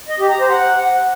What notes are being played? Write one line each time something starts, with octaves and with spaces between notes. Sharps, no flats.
D#5
G4
A#5
C5
F#5